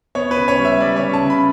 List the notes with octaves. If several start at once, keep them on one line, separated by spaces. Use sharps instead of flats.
B3 C#5
B4
C#3
C#5
G3
E5
G3 D5
C#5
C#3
A5
C#3
B5